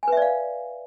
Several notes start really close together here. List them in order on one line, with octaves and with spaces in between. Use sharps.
G#5 B4 E5 D5 F5